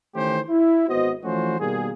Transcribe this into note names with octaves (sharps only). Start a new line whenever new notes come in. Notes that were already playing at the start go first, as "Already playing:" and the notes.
D#3 E3 A3 C#4 G4 C5
E4
G#1 B3 F#4 C5 D#5
E3 F3 A3 C#4 F#4 C5
B2 D#3 G3 A#3 G#4